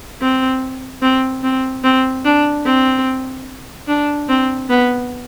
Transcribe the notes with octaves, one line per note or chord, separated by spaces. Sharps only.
C4
C4
C4
C4
D4
C4
D4
C4
B3